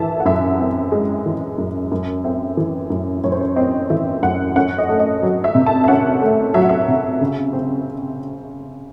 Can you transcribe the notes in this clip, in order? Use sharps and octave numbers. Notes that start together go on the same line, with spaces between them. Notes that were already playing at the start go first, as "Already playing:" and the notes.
Already playing: E3 E5 A5
F#5
F#2 E5
C4
G#3
E3
F#2
F#2
C4 E5
E3
F#2
F#2 C#5
C5
C#5
C4 D#5
E3 E5
F#2 F#5
C#4 F#5
D#5
A3
D#5
F#3
E5
C3
A5
E5
C#4 F#5
A3
F#3 E5
F#5
E5
C3
C#3
C4